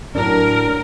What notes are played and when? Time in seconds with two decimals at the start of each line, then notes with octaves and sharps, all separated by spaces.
0.15 A2 F#3 D4 A#4